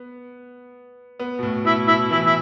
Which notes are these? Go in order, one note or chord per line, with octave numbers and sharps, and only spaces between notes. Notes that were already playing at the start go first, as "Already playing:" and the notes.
Already playing: B3
B3
B2
A2
B2 E4
B2 E4
E3 E4
E4